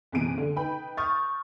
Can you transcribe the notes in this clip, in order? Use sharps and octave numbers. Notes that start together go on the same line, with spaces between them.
F#1 C2 B2 E3 D7 D#7
D3
D#4 B4 G5 B5
C#6 D#6 F6 G6 A6